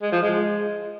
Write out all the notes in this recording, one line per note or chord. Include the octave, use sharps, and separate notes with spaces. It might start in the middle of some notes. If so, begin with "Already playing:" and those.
G#3
F3
G#3